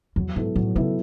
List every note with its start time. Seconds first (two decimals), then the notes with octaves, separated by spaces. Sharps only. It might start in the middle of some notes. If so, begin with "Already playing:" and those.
0.16 E2 F#3
0.36 G#2 B3 E4 A4
0.55 A2 F#3
0.75 C#3 B3 E4 A4